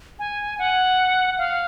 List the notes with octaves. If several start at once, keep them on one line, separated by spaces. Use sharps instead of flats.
G#5
F#5
F5